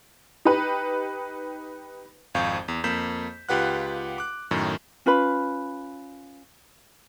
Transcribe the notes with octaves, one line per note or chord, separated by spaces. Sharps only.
D#4 G4 B4
G#1 F2 F5 C#6 G6
E2
F2 A#3 G6 B6 E7
C#2 F4 G4 B4 F#5 F#6
D6 F#6
F#2 A2 D#3
C#4 F4 B4 B5